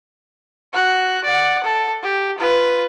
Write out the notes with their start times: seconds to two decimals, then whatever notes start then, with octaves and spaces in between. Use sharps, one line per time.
0.73 F#4 F#6
1.24 D5 F#5
1.64 A4
2.03 G4
2.38 F4 B4